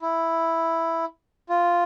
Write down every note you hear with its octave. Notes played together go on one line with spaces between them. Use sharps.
E4
F4